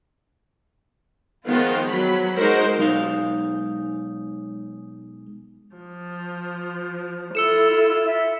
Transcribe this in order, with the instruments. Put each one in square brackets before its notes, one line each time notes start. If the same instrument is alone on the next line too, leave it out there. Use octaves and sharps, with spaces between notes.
[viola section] D#3 F3 G#3 B3 F4
F#3 B5
G#3 D#4 F#4 A#4 C5
[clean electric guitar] B1 G#3 D#4 F5
[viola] F3
[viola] E4 F4 [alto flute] A4 [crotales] E6 C#7 E7
[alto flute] E5